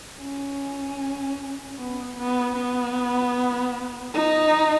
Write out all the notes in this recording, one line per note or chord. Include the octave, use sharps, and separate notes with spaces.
C#4
B3
B3
B3
D#4